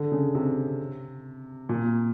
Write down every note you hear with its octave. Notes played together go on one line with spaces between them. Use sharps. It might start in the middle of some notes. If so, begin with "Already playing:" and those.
Already playing: D3
C#3
C3
A#2